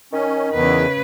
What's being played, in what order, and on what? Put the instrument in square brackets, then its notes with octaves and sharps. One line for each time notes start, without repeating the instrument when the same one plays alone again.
[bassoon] D#3 [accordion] C#4
[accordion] E2 [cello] C#3 B4